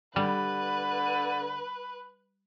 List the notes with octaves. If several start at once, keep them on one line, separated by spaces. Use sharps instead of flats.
D3 G3 B4